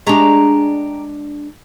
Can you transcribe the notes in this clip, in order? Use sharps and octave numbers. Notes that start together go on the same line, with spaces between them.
G#3 D4 G4 A#5 C#6